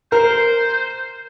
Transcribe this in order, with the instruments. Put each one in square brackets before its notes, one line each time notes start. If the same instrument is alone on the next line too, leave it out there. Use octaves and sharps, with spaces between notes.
[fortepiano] A#4 [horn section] C5